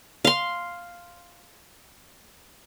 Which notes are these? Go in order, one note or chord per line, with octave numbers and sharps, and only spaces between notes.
F5 C6